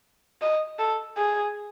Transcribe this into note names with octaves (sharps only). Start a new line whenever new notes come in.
D#5
A4
G#4